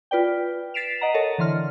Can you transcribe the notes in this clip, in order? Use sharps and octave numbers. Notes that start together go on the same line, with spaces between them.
F4 B4 D5 G5
A6 B6 C7 D7 E7 F7
D#5 F#5 A#5
A4 A#4 C#5 D#5 A5
D3 E3 C6 F6